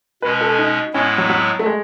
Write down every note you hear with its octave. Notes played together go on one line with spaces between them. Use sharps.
B2 G#3 C#4 B4
A4
D#4
A2 G#3 B3 C#4 E4
F#3
F#3
A3
G#3